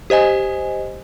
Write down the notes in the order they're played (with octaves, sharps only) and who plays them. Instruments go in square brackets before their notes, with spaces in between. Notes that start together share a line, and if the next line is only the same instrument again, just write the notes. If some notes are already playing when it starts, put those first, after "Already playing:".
[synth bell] G4 C5 D#5 G#5